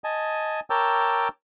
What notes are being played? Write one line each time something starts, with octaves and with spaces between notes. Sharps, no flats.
D#5 G#5 A5
A#4 C#5 G5 A5 D6 E6